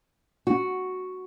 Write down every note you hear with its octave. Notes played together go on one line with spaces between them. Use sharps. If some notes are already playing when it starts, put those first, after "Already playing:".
F#4